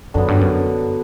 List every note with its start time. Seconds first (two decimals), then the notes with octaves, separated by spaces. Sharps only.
0.14 F#2 D3 F#3 B3 D4
0.28 G2
0.41 F#2